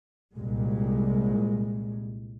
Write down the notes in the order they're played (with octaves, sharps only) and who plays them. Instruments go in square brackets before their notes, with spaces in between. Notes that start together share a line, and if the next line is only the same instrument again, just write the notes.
[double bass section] C2 A#2 G#3